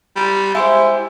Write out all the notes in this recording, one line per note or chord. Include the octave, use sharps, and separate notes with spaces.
G3
G#3 E4 G4 C5